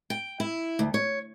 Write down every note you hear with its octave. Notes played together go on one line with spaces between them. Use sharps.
G5
E4
D2
C#5